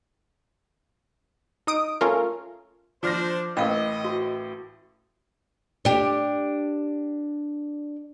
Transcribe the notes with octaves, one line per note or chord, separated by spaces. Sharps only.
D#4 D#6 D7
A3 C#4 F4 A#4
F3 D4 C5 F6 A#6
A1 A2 A#4 D#5 F5 G5
F#4
D4 G4